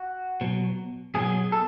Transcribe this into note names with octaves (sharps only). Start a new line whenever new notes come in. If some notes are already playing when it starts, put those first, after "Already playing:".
Already playing: F#4
B2 F#3
B2 F#3 G#4
A4